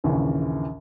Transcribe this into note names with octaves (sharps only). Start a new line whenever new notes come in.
A#1 D#2 C#3 E3